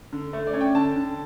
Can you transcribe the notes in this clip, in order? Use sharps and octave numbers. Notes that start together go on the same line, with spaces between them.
D3
A3
D5
C#4
G5
D3 A5
D3